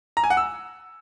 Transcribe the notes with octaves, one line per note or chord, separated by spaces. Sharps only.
A#5
G#5
F#5
E6